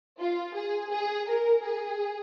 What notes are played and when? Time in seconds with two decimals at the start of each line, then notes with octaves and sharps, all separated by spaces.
0.20 F4
0.55 G#4
0.91 G#4
1.29 A#4
1.63 G#4